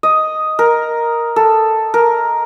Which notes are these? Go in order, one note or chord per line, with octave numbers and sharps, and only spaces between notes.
D#5
A#4
A4
A#4